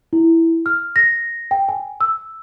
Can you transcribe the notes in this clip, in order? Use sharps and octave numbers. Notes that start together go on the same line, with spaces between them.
E4
F6
A#6
G5
G#5
E6